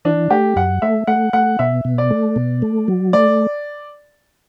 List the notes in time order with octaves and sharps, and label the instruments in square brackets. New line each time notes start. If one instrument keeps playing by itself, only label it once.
[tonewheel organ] E3 [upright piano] D4
[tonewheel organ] A3 [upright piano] G4
[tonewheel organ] F#2 [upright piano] F#5
[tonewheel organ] A3 [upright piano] E5
[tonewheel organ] A3 [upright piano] F#5
[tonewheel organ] A3 [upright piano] F#5
[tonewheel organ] B2 [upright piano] E5
[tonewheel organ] B2
[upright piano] D5
[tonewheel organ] A3
B2
A3
F#3
[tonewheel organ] A3 [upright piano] D5